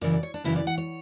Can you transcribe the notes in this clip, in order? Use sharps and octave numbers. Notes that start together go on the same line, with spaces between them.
F#2 C#3 E3 D5
D5
C#5
D4
F#2 C#3 E3 E4
D5
F#5
C#5